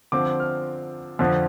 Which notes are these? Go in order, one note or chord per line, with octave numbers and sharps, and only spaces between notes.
D3 F3 C4 D6
F6
F2 D3 F3 C4